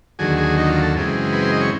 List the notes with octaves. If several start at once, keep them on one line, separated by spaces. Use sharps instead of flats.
D#2 D3 F#3 G#4
G#4
D#4
F4
A4
F#2 C#3 E3 G#3 C4
B4
C5
D#5
C#5